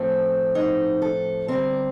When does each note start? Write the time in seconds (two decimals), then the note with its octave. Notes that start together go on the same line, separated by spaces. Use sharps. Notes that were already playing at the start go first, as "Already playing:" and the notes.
Already playing: A2 F3 A3 C4
0.55 D#4
1.02 A4
1.48 D3 G3 C4 A#4